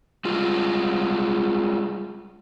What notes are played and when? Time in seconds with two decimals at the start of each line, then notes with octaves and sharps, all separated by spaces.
0.25 G3 G#3 F4